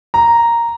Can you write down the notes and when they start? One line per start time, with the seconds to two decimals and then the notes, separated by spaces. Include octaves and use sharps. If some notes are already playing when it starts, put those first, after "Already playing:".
0.14 A#5